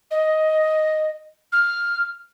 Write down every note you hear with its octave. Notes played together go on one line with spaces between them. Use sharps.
D#5
F6